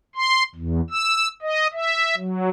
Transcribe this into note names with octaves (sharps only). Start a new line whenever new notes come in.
C6
E2
E6
D#5
E5
F#3